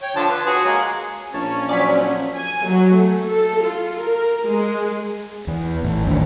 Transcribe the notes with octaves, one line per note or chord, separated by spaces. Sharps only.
C#5 G5
D3 F3 A5
B4
F#4 G#4 C#5
G#3 A#3 G#4
A#1 C#4 C#5 A5
F3 F#3 D5 G#5 B6
G#5
F#3
A3
A4
F4
A#4
G#3
E2
A1
A1 D#2 D4